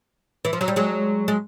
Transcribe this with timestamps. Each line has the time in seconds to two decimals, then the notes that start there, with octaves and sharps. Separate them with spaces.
0.45 E3
0.53 F3
0.61 F#3
0.68 G3
0.76 F#3 G#3
1.28 G#3